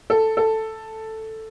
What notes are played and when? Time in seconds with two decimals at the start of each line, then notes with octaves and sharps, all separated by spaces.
0.10 A4
0.37 A4